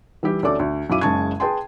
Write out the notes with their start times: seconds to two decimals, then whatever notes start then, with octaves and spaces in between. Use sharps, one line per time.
0.23 E3 G3 E4 G4
0.43 D2 C#4 A4 D5 D6
0.59 D2
0.90 F#2 F#3 E4 F5 D6 D#7
1.01 F#1 C#3 G#3 A5 C#6 G#6
1.40 G#4 B4 G5 A5 C6